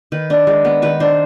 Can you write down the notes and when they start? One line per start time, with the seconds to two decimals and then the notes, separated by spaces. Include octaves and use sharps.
0.12 D#3 B4
0.30 D4
0.47 G#3
0.65 B3
0.82 D#3 B4
1.00 D4 C5